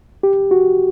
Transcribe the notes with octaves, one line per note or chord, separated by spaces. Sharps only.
G4
F#4